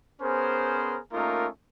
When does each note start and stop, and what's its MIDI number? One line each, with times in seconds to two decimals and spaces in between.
0.21 0.99 59
0.21 0.99 61
0.21 0.99 68
0.21 0.99 70
0.21 0.99 72
1.13 1.47 57
1.13 1.47 58
1.13 1.47 61
1.13 1.47 63
1.13 1.47 65
1.13 1.47 70